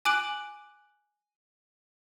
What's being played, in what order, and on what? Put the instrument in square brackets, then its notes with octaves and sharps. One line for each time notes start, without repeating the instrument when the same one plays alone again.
[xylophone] G#5 D6 F#6 D7 F#7